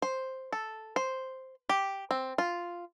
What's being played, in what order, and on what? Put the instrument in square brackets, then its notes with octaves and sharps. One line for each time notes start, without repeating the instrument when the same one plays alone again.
[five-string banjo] C5
A4
C5
G4
C4
F4